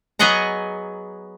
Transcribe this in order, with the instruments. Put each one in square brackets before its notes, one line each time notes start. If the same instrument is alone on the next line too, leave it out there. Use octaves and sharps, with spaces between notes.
[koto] F#3 B3 G#4 D#5 F#5 A#5